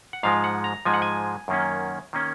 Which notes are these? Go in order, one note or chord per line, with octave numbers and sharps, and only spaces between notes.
F#5
G#2 F3 G#3 F5
F#5
A#5
G#2 F3 G#3 G#5
F#5
G#5
F#2 D#3 A#3 C#4
D#3 A#3 C#4